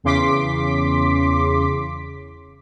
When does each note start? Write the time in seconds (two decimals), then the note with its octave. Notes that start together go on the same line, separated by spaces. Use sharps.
0.04 E2 C#3 C6 D6 B6